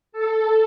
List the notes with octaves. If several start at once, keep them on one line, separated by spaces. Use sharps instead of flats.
A4